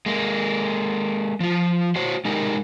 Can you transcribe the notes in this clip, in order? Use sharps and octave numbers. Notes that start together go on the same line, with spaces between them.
G#3 A#3
F3 F4
F#4 C5 C#5
G#3 D#4 G4 A#4